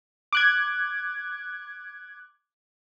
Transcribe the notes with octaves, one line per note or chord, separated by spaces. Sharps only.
D6 F#6 G#6